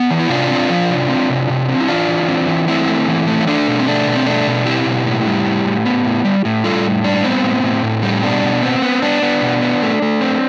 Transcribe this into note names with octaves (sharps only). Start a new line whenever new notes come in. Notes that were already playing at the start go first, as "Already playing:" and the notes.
Already playing: B3 G4
E3
E4
C3 D4 F4
C4
F3
C3
C4
C3
C3
C4
E4
E3 D4 F4
E3
C4
E3
A3 C4 E4
A3
E3
A3
E4
A3 D4
B2
C4
A3 D4
B2
C4
A3 D4
B2
C4 E4 G4
B2
A2
G3
A2
A2
B3
A2
G3
A2
G3 F4 A4
A2
G3 D4
B3 C4
A2
A2
A2
G3
B2 D4
B2
B3 C4
B3
B3 D4
B3
B2
B3
A3
A3
C4